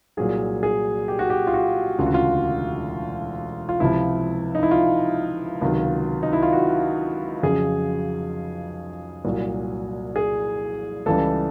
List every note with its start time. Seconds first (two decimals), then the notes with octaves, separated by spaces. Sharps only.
0.17 C2 A#2 F#3 G#4
0.63 G#4
1.08 G4
1.19 F#4
1.30 G4
1.47 F4
1.54 F#4
1.99 E1 D2 C#3 F4
2.06 F#4
2.14 F4
3.69 F4
3.80 C#2 C3 F3 E4
4.55 D#4
4.63 E4
4.71 F4
5.61 C#2 C3 D#3 F#3
6.23 D#4
6.33 E4
6.43 F4
6.53 F#4
7.43 F2 C#3 F#3 G#4
9.25 C2 A#2 F#3
10.16 G#4
11.06 C#2 C#3 E3 G3 A4